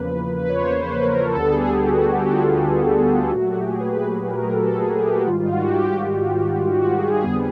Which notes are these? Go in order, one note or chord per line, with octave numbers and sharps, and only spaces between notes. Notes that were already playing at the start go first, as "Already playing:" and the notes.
Already playing: E2 C#3 F3 A#3 B4
B4
C#5
C5
C5
B4
A#4
A4
D2 D3 G3 B3 A4
G#4
G4
F#4
G4
F#4
F4
A#2 F#3 A3 F#4
G4
G#4
B4
A#4
A4
G#4
G#4
G4
F#4
G#2 D#3 G3 F4
F4
F#4
G4
G4
F#4
F#4
G#4
G#4
F2 D3 G3 B3